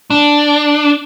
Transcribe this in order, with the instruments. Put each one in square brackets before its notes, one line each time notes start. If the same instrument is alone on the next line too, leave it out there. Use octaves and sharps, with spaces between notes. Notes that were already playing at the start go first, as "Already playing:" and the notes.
[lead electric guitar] D4